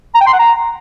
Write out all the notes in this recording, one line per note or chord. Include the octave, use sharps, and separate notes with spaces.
A#5
G5
C6
F#5
A#5